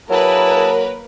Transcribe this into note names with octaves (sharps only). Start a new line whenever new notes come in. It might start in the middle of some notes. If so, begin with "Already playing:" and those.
F#3 A#3 E4 G#4 A#4 B4 A5